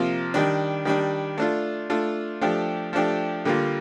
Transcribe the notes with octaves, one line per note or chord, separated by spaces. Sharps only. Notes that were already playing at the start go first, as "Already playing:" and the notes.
Already playing: C3 F3 A#3 F4
D#3 G3 D4
D#3 G3 D4
A3 D4 F4
A3 D4 F4
F3 A3 D4 G4
F3 A3 D4 G4
D3 G3 A#3 F4